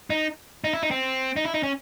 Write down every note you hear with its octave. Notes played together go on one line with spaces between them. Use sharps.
D#4
D#4
E4
D#4
C4
D#4
E4
D#4
C#4